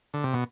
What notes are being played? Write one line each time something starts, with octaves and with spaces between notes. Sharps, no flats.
D3
C3
B2